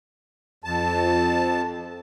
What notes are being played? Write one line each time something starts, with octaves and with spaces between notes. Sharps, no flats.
F2 A5